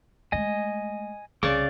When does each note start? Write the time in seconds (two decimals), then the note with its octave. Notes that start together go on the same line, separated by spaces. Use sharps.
0.32 G#3 A3 D#5 G#5
1.43 C2 C#3 D5 D6